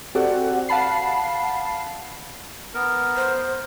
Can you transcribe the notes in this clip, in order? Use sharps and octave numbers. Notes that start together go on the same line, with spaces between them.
C4 F#4 G4 A4 D5 F#5
F5 F#5 A5 B5 C7
B3 A#4
C5